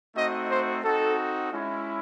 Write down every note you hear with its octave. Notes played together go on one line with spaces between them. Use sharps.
A3 C4 D#4 F#4 D#5
C5
C4 D#4 F#4 A4
G#3 C#4 E4